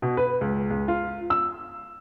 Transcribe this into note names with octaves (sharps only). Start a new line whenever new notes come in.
B2
B4
C#2
C#2
F4
E6